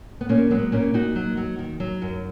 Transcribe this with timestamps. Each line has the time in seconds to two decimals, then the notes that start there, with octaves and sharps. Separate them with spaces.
0.21 B3
0.29 A#2 A#3 C#4
0.51 F#3 G#3 B3
0.72 A#2 A#3 C#4
0.94 A#2 D#4 F#4
1.16 F#3
1.37 F#3
1.59 D#3
1.80 F#3
2.02 F#2